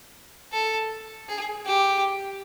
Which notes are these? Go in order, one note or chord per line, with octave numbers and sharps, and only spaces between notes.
A4
G#4
G4